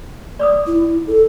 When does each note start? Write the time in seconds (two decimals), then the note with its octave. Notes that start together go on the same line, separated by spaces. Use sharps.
0.39 D5 D6 D#6
0.67 E4
1.07 A4